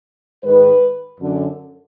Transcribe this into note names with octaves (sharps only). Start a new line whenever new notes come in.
G#2 D#3 B4
F#2 D3